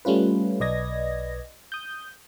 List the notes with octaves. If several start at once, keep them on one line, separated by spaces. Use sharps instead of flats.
G3 A3 C#4 F4 B4
B1 B4 D5 D#5 G#6 A#6
D#6 G6